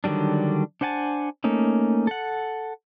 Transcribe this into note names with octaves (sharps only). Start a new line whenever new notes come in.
D3 D#3 F#3 G3 D4
D4 C5 F#5 G#5 A5
A3 A#3 C#4 D#4
A4 F#5